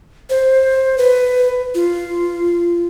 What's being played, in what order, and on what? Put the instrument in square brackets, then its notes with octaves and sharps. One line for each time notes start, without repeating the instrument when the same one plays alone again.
[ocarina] C5
B4
F4